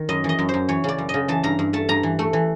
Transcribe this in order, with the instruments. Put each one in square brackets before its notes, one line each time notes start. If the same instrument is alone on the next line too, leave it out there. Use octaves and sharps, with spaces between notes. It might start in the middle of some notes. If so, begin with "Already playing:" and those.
Already playing: [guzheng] D#3
F#2 D#5
E3 D#5
F#2
C5
F#2
E3 C#5
C#3 D5
F#2
C#3 D#5
E3 A5
G2 A#5
G2
A3 A5
G2 A#5
E3
A3
E3